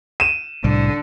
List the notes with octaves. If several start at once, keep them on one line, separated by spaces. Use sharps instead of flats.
D#7 E7
C2 A2 D3 G3